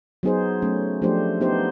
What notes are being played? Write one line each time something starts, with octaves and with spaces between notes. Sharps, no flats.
F#3 B3 D#4 G#4 C5
F#3 A3 C#4
F3 A3 D4 G4 C5
B3 D#4 G4 C5